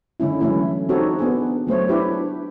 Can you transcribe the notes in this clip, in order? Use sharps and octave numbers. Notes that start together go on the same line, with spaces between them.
D3 G#3 C#4 E4
E3 F#3 A3 C#4 E4
C4 D#4 F#4 G4 A4 C#5
B3 D4 G#4
F#3 A3 C5 C#5
D4 E4 G4 B4